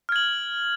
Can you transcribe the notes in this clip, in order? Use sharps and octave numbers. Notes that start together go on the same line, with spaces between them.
F6 G#6 F#7